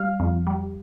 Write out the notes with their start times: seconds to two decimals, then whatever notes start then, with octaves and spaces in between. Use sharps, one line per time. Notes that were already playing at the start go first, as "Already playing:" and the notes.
Already playing: G3 F5
0.20 F2
0.47 G3